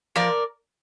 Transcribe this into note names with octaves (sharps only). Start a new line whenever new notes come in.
F3 A#4 D5